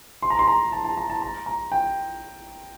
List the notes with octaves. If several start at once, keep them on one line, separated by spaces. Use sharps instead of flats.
C6
A#5
C6
A#5
A5
A5
A#5
A5
A#5
A#5
G5